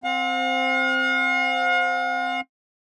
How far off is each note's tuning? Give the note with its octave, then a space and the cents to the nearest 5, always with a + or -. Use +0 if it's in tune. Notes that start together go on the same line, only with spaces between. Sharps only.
C4 +0 F5 +45